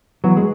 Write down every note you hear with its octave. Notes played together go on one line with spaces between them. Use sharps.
E3 F#3 B3 F#4
G#3